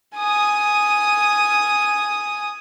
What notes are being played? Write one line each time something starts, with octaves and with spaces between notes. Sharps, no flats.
G#5 D#6